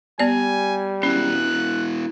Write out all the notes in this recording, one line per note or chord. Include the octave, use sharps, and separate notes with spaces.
G3 B3 D5 G#5
B3 C#4 E4 F#4 F#6